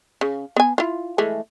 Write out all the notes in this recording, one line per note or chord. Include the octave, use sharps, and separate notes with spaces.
C#3
B3 G#5
E4 F4
E3 G#3 A3